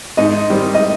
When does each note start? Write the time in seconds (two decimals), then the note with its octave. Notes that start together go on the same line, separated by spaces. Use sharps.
0.17 G#2 D#4 D#5
0.50 D#3 G3 C4
0.74 D#5